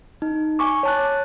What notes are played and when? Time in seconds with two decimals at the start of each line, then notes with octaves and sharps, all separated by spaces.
0.22 D#4
0.59 G#5 C#6 D6
0.83 C#5 A5 F#6